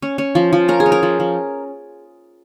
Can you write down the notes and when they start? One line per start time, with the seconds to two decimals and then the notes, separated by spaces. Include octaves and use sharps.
0.02 C#4
0.18 C#4
0.35 F3
0.53 F3
0.68 C#4 A#4
0.80 G#4
0.86 C#4
0.92 A#4
1.03 F3
1.20 F3